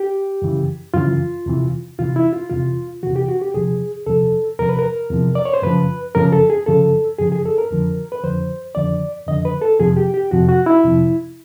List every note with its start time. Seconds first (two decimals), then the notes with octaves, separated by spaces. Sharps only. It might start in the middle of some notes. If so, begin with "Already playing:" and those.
Already playing: G4
0.42 F#2 C#3 E3
0.94 F#2 C#3 E3 F4
1.46 E2 C3 E3
1.99 E2 C3 E3 F4
2.16 E4
2.33 F4
2.50 E2 C3 E3 F4
3.03 E2 C3 E3 F#4
3.16 G4
3.28 F#4
3.42 G4
3.54 E2 C3 F3 G#4
4.06 E2 C3 F3 A4
4.59 E2 C3 F3 A#4
4.69 B4
4.79 A#4
5.10 E2 C3 F3
5.35 D5
5.45 C#5
5.54 C5
5.62 F#2 C#3 F3 B4
6.15 F#2 C#3 F3 A#4
6.32 A4
6.50 G#4
6.66 F#2 C#3 F3 A4
7.19 F#2 C#3 F3 G#4
7.32 G#4
7.45 A4
7.58 A#4
7.71 F2 D3 F3
8.12 B4
8.23 F2 D3 F3 C5
8.75 F2 D3 F3 D5
9.27 F2 D3 F3 D#5
9.45 B4
9.62 A4
9.79 F2 C3 F3 G#4
9.97 G4
10.14 G4
10.31 F2 C3 F3 F#4
10.49 F#4
10.66 E4
10.84 F2 C3 F3